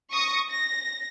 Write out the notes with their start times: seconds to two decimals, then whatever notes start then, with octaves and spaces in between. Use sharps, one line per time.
0.11 C#6 D#6 A#6 C#7
0.47 A#6